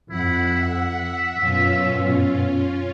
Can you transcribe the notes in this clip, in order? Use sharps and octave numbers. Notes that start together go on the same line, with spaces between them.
F2 E4 F#5
E5
F#2 B2 C#4 F4